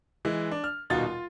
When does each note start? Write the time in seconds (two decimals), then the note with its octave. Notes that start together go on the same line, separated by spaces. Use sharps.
0.25 E3 G#3
0.51 D4
0.64 F6
0.90 D#1 B2 D#4 F4 F#4 A6
1.06 F4